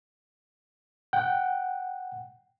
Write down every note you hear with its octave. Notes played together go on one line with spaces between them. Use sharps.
F#5 G5